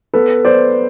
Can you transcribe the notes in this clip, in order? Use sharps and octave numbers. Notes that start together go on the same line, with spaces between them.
B3 A4 B4
B3 C5 D5